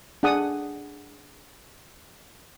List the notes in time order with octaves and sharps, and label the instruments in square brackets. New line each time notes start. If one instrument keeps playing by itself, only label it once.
[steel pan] D4 G#4 F#5 A5 D#6